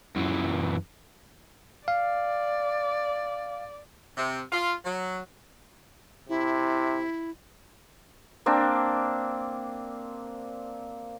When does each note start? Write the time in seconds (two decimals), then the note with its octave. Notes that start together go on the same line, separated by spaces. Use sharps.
0.16 F#2 E3
1.88 D5 F5
4.17 C3
4.52 F4
4.85 F#3
6.29 C3 E4
8.46 A#3 C4 D4